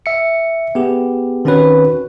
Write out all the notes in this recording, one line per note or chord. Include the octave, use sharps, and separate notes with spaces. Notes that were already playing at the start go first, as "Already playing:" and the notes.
E5 C#7
B3 G4 G#4
D#3 C4 C#4 F#4 B4 C#5